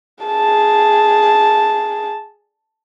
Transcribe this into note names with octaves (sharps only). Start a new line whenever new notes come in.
G#4 A5